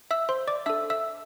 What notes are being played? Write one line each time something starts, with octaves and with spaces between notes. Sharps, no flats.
E5 E6
C5 C6
D5 D6
D4 A4 E5 E6
E5 E6